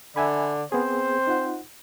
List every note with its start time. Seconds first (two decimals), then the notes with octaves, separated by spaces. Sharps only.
0.16 D3 D5 E5 G#5 B5
0.72 B3 C4 G#4 C5
1.27 D#4 F4 F#5